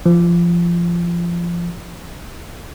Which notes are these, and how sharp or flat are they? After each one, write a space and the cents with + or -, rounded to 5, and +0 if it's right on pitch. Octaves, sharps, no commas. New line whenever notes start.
F3 -20